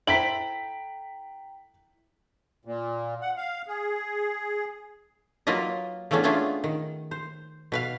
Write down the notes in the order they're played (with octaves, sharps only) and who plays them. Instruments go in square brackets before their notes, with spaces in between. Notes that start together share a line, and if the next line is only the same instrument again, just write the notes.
[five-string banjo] E4 A4 C5 [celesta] G5 A#5 [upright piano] B6 D7 F#7
[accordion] A#2
F#5
F5
G#4
[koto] F#3 A#3 F4 B4 D#5
C#3 E3 A3 B3 C#4 D4
A3 B3 C#4 D4 F4 G#4
D#3
C5
B2 B4 F5